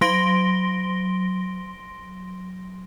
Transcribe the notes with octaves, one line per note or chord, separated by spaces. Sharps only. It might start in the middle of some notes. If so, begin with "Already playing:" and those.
F#3 C6 A#6 D7 G7